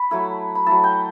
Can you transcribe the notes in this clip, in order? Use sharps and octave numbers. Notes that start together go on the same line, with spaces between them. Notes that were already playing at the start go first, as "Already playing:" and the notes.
Already playing: B5
F#3 A3 E4
B5
F#3 A3 E4 A5
G5